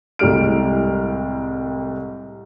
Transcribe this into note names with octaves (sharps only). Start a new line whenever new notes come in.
C2 A2 G3 G#3 F6 D7